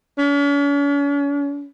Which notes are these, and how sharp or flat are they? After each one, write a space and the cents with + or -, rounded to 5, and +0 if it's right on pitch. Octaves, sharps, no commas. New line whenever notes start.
C#4 +45